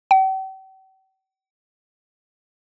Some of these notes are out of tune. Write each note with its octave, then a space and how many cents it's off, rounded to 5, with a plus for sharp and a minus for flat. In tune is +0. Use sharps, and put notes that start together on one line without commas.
G5 -45